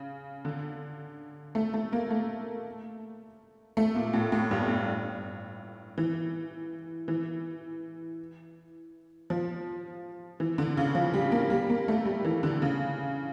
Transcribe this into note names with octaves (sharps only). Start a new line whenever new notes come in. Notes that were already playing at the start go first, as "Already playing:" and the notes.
Already playing: C#3
D3
A3
A3
A#3
A3
A3
A#2
A2
A2
G2
A2
E3
E3
F3
E3
D3
C#3
F3
G3
A#3
G3
A#3
A3
G3
E3
D3
C#3